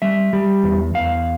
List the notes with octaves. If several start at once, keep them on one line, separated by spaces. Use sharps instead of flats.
G3 E5
G3
E2
E2 F5